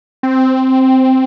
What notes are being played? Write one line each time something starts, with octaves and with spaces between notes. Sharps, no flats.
C4